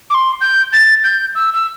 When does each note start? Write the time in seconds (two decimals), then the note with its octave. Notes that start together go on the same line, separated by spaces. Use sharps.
0.10 D6
0.14 C6
0.41 G6
0.73 A6
1.04 G6
1.35 E6
1.54 E6